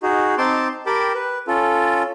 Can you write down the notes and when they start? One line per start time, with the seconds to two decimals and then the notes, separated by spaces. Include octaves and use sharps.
0.03 D#4 F#4 G#4
0.38 C4 D#4 A5 C6 D6
0.86 G4 A#4 G5 A5 B5 D6
1.15 B4
1.47 C#4 F4 A4